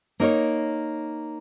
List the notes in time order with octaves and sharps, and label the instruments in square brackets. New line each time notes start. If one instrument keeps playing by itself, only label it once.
[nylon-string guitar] A#3 D#4 A#4 C#5